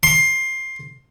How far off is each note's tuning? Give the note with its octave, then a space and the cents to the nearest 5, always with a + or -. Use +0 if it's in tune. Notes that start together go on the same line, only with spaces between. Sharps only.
C6 +15